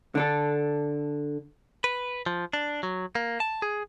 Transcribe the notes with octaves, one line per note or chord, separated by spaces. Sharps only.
D3 D4 A4
B4
F3
D4
F#3
A#3
A5
G#4